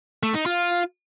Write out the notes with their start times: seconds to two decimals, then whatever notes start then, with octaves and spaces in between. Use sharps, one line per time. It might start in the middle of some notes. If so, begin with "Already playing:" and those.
0.23 A3
0.34 D#4
0.46 F4